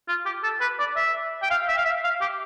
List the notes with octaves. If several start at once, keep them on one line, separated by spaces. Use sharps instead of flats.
F4
G4
A4
B4
D5
E5
G5
F5
E5
F5
E5
F5
G4